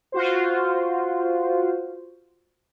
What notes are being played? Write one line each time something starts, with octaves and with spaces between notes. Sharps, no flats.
F4 F#4 C5